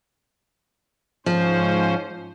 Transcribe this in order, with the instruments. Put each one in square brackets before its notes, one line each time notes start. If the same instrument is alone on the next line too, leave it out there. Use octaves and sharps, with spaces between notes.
[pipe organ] G#2 C#4 C5 [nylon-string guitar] F3